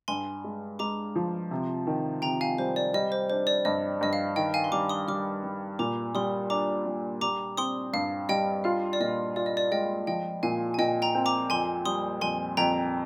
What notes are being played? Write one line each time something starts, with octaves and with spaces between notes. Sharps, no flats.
G2 G#5 C6
G#3
G#3 A#5 D6
F3
C3
D#3
C3 G5 A#5
F5 G#5
G3 C5
D5
G3 D#5
C5
D4 C5
D5
G2 D#5
G2 D#5
F5
D#3 D#5 G5
F5 G#5
C6
G3 A#5 D6
C6 D#6
G3 D6 F6
G3
A#2 A#5 D6
G3 C6 D#6
D4 A#5 D6
G3
G3 A#5 D6
C4 C6 D#6
G2 F5
G3 D#5 G5
F4 F5
D5
A#2 D#5
F4 D5
D#5
D5
G#3 D#5 G5
F3 D#5 G5
A#2 F5 G#5
G#5
A#2 D#5 G5
G5 A#5
C4
A#5 D6
F2 G#5 C6
G3 C6 D#6
F2 G#5 C6
F2 G5 A#5